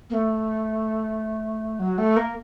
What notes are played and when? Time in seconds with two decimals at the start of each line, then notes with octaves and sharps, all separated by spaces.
0.10 A#3
0.14 A3
1.79 F#3
1.98 A3
2.17 A#3